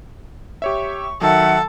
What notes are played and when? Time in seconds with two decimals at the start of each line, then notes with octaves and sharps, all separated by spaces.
0.62 G4 C#5 E5 C#6
1.21 D#3 F#3 A4 E5 F#5